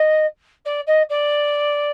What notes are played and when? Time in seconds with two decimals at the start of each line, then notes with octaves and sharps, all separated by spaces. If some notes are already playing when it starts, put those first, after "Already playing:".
Already playing: D#5
0.65 D5
0.87 D#5
1.09 D5